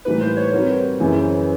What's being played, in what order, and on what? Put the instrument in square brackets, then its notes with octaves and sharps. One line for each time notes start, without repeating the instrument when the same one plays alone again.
[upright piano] A2 E3 G3 A#3 D#4 [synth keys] B4
[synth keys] C5
C#5
[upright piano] G3 C4 D#4 F#4 A#4
F#2 C#3 E3